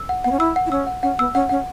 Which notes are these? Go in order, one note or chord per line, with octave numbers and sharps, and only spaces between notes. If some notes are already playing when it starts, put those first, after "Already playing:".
Already playing: E6
F#5
B3 F#5
C#4
E4 E6
F#5
E4
C#4 E6
F#5
C#4 F#5
B3 E6
C#4 F#5
C#4 F#5